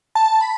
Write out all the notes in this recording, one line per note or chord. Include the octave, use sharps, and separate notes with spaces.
A5
B5